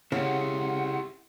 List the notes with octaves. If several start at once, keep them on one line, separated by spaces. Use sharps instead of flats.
C#3 E4 G4 F#5